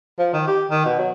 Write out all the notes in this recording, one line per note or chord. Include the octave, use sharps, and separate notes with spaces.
F3
D#3
G4
D#3
B2
F#3